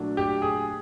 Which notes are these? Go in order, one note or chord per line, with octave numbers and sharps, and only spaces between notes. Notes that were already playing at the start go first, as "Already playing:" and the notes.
Already playing: A#2 F#3 A3 D4
G4
G#4